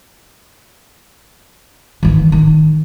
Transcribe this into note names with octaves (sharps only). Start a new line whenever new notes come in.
D#3 E3
D#3